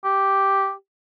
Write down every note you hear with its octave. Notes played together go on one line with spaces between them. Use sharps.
G4